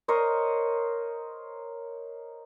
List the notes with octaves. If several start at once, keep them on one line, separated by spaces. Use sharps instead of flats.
A#4 C5 C#5 D#5